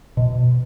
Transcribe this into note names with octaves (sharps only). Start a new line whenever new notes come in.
B2